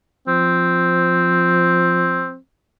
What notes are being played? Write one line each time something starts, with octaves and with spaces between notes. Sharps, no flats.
F3 C4